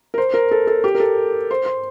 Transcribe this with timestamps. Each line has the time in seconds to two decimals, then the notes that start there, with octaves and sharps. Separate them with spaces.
0.14 A#4
0.18 C5
0.34 A#4
0.51 A4
0.67 A4
0.84 G4
0.95 A#4
1.00 A4
1.51 C5
1.66 C5